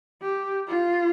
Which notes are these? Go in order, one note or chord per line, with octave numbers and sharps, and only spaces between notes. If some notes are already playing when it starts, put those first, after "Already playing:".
G4
F4